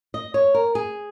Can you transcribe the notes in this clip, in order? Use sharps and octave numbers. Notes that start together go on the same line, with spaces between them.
D#5
C#5
A#4
G#4